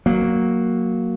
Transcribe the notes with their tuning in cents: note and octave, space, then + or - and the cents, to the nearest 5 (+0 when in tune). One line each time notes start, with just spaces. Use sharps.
F#3 +0 A#3 +0